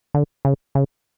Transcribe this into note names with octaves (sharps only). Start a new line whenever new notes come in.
D3
C#3
C#3